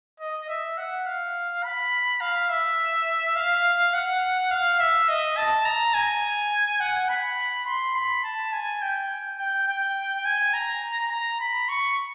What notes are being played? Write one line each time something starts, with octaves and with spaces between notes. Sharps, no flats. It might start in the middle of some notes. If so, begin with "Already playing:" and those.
D#5
E5
F#5
F5
B5
F5
E5
F5
F#5
F5
E5
D#5
A5
A#5
G#5
F#5
B5
C6
B5
A5
G#5
G5
G5
G5
G#5
A#5
A#5
B5
C#6